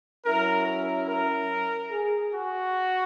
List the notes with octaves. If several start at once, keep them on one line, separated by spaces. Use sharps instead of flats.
F#3 C#4 E4 A#4
A#4
A#4
G#4
F#4